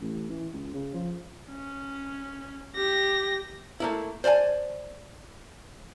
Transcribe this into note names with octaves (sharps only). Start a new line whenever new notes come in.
A1
E3
C#2
C#3
F3
C#4
G4 A#6
A3 A#3 E4
C5 D5 F5 G#5 A5